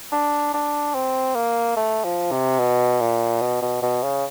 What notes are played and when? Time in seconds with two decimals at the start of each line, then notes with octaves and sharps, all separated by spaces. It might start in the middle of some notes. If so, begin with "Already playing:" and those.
0.12 D4
0.53 D4
0.94 C4
1.35 A#3
1.77 A3
2.04 F3
2.31 C3
2.59 B2
3.00 A#2
3.41 B2
3.62 B2
3.82 B2
4.03 C#3